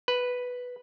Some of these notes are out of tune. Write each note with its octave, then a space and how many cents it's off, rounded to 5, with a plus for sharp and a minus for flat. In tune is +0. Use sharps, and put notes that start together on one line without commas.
B4 +0